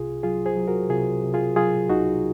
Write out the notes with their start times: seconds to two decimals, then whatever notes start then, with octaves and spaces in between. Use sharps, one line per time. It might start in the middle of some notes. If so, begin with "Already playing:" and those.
Already playing: C2 C3 F4 G#4
0.23 F#3 F4 G#4
0.46 G#4 C5
0.57 F#3
0.68 F#4 A#4
0.90 C3 F4 G#4
1.23 C3
1.34 F4 G#4
1.56 F#3 F4 G#4
1.90 C2 D#4 F#4